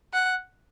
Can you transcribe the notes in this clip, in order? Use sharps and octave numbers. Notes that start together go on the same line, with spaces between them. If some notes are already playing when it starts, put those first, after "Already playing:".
F#5